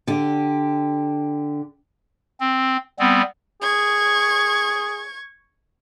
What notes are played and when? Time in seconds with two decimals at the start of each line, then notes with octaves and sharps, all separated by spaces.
0.07 D3 G4
2.40 C4
2.99 G3 B3 C4
3.62 G#4 C#6 G#6